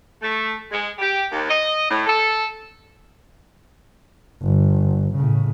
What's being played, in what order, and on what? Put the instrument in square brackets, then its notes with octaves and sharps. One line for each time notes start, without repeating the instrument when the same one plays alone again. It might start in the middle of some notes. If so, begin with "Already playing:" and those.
[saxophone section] A3
G#3
G4
D#2
D#5
A2
A4
[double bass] G1
A2 C#3